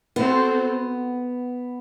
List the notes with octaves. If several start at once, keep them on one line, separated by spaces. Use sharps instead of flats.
B3 C4 F#4 A4 C5